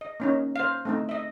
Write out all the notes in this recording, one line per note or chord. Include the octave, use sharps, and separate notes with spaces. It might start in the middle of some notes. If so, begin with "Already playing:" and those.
D#5
A#3 C#4 D#4
C5 F5
A3 C4 D#4
D#5 E5